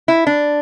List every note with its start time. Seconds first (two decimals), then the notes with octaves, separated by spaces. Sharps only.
0.08 E4
0.27 D4